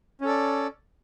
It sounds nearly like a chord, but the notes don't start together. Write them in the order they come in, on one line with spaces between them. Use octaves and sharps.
C#4 A4 D5